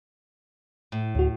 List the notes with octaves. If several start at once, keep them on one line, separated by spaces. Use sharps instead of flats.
A2
D2 F#4